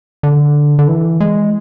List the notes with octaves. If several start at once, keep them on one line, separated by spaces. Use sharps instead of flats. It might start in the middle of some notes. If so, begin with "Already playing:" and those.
D3
D3
E3
G#3